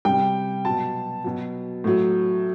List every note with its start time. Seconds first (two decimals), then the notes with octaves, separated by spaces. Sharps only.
0.05 C3 G3 G5
0.65 B2 F#3 A5
1.24 B2 F#3
1.84 A2 F#3